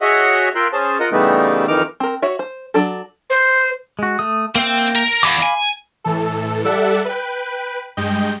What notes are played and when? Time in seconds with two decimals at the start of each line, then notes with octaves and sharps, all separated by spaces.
0.01 F#4 G#4 C#5 D#5 E5 F#5
0.55 F4 A#4 E5 G5 C6 F#6
0.73 C#4 G#4 C5 A5
1.00 F4 A#4 D#5 F#5
1.12 C#3 E3 G3 A3 B3 D#4
1.68 F2 D#3 E3 D#4 D6 F6
2.00 C4 A#4
2.22 F#4 C#5 E5
2.39 C5
2.74 F#3 D4 A4
3.30 C5
3.99 G#3 F#4
4.19 A3 D#6
4.55 A#3 C4 E5 G5
4.96 A#4
5.23 E2 F5 B5 D6
5.42 G#5
6.04 A2 E3 A4
6.64 G3 A4 D5 E5 F#5
7.05 B4 G5
7.97 G2 G#3 D#5 G5 G6